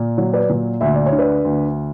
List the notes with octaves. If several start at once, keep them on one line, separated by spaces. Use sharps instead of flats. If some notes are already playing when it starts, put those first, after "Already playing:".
Already playing: A#2
F#3
B4 D5
A#2
D2 E5
D5
C#5
D3
B4 D5
D2